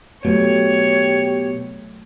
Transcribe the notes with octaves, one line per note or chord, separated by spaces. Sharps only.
B2 F#3 A3 G4 C#5